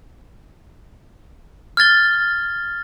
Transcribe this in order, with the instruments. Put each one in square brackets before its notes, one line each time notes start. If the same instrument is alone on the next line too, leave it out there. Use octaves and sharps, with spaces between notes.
[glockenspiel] F6 G#6 A6 G7